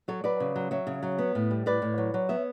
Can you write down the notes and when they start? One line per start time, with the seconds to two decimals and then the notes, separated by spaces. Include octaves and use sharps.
0.08 F#3 A4 C#5
0.24 F#3 B4 D5
0.40 C#3
0.56 F#3
0.71 F#3 C#5 E5
0.87 C#3
1.03 F#3
1.18 B3
1.35 A2
1.51 G3
1.66 A2 B4 D5
1.82 A2
1.98 F#3
2.14 F#3
2.29 B3 C#5 E5